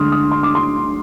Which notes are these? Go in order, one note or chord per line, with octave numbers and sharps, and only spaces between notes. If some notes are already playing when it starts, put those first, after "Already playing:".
Already playing: D2 D3 G#3 C6 D6 D#6 F6
D#6
C6
D6
C6